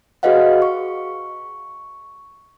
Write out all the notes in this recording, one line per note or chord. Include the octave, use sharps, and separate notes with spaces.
F#4 G#4 B4 D#5 F5 F#5
C#6